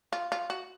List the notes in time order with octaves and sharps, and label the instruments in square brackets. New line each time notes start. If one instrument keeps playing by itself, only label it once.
[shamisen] F4
F4
F#4